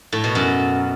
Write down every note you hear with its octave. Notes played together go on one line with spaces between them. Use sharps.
A2
B2
F#2